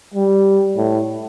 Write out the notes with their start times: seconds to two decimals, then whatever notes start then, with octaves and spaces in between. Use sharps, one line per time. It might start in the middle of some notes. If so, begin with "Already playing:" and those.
0.14 G3
0.76 A2